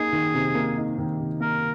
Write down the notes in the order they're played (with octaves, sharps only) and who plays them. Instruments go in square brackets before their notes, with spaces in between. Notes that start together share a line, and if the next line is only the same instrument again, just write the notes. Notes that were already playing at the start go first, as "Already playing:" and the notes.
Already playing: [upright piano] A#3 D#4 [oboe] G#4
[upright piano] D#3
C3
A#3
D#4
D#3
C3
[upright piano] A#3 [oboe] A#4